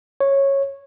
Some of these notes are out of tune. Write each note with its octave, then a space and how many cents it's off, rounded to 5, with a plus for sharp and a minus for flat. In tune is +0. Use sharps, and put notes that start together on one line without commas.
C#5 -10